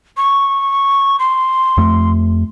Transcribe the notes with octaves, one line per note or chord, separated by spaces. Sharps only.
C#6
C6
F2 A3